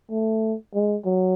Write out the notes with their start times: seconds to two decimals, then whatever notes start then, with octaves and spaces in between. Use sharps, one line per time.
0.11 A3
0.74 G#3
1.05 F#3